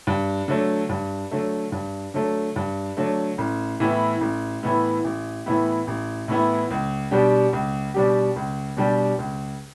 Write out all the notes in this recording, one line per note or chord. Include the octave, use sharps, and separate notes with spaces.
G2
D3 F#3 A3
G2
D3 F#3 A3
G2
D3 F#3 A3
G2
D3 F#3 A3
A1
A2 E3 B3 E4
A1
A2 E3 B3 E4
A1
A2 E3 B3 E4
A1
A2 E3 B3 E4
C#2
B2 G3 D4 G4
C#2
B2 G3 D4 G4
C#2
B2 G3 D4 G4
C#2